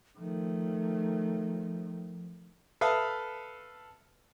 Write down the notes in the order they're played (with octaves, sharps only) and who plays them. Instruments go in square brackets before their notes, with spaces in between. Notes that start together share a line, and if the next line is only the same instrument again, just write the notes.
[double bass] D#3 A3 [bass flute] F3
[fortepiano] A4 B4 E5 F5 D#6 F6